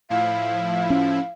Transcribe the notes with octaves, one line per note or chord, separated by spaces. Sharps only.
A2 F3 E4 F5
C#4